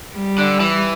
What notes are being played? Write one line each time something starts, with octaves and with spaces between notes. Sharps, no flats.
G3
D3
E3